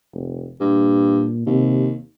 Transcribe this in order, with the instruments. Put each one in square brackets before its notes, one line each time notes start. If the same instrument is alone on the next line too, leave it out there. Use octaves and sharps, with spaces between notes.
[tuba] F1
[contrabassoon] G2 [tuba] A#2
[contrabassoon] D#2 [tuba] C3